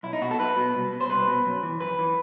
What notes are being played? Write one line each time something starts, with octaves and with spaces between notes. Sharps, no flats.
B1 E4
D#4
B2 F#4
A4
B1 B4
B2
C2
B2
C5
C2 B4
B2
F#2
E3
F#2 B4
E3